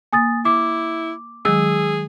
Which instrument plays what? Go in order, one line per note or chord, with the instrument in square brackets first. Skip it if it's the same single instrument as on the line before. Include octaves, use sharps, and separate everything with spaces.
[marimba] A#3 [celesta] G#5 D#6 A6
[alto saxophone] E4 [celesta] D6
[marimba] D#3 F#3 G#3 [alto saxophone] G#4 [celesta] E6